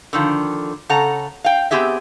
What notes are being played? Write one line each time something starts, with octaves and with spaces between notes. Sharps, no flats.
D3 D#3 F3
C#3 A4 F#5 A#5
F5 G5
B3 C4 G4 G#4 E5